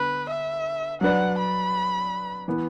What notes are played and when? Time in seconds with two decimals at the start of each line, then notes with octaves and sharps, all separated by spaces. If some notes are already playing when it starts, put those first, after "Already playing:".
Already playing: D3 B3 B4
0.29 E5
1.01 F#3 D4 B4 D5 F#5
1.38 B5
2.48 E3 B3